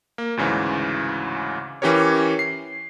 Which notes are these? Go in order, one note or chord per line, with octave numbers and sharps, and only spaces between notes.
A#3
D2 G#2 C#3 E3
E3 C#4 G4 A#4 C#5
C7